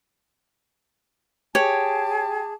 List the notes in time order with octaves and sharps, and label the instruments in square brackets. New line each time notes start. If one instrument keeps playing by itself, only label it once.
[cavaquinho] G4 [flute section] G#4 A5 [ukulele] C#5